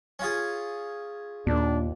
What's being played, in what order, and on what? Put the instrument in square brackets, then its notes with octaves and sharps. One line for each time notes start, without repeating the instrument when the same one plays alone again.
[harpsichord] C#4 F4 G#4
[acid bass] D#2 [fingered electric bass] A#2 [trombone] D4